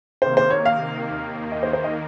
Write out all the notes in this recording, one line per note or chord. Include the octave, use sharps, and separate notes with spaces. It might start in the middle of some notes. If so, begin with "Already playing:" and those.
C3 D#3 A#3 C5
C5
C#5
F5
D#2 D#3 A#3
D#5
C5
C5
D#5